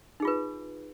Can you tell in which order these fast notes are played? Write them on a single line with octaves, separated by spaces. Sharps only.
D#4 G#4 F4 B4